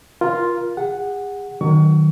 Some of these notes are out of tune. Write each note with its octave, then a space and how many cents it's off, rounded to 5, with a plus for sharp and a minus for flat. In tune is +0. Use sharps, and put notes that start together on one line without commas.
F4 +0 A#4 +25
G#4 -40 F#5 +0
D#3 -15 F#3 +0 C#6 +30